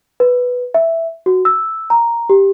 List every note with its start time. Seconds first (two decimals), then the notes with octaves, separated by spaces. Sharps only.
0.20 B4
0.74 E5
1.26 F#4
1.45 E6
1.90 A#5
2.30 G4